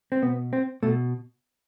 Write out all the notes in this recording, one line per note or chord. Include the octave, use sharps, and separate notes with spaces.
C4
B2 B3
C4
B2 A3